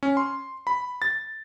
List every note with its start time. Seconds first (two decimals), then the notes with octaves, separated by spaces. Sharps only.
0.03 C#4
0.17 C6
0.67 B5
1.02 A6